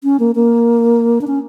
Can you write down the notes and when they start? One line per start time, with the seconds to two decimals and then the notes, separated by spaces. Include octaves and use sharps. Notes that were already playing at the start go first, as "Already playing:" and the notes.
0.04 C#4
0.20 A#3
0.35 A#3
1.21 D4
1.27 C#4